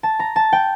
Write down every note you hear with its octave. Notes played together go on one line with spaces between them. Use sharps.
A5
A#5
A5
G5